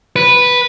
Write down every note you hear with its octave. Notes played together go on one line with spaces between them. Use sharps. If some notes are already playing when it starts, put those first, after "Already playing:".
B4